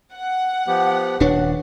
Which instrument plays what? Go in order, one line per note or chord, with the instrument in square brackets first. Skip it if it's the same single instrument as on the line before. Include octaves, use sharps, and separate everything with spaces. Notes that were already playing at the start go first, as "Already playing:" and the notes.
[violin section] F#5
[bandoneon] F3 B3 G4
[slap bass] D#1 D4 [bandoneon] F#4 [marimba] B4 C#5